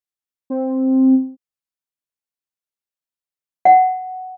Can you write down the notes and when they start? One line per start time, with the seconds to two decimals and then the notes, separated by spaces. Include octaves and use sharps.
0.50 C4
3.65 F#5